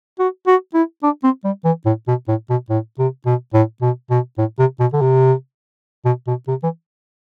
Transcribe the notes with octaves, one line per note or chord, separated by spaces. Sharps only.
F#4
F#4
E4
D4
C4
G3
E3
A2
B2
A2
B2
A2
C3
B2
A2
B2
B2
A2
C3
B2
D3
C3
B2
B2
C3
E3